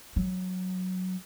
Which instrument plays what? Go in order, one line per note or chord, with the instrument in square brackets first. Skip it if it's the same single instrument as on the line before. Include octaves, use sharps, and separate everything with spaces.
[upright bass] F#3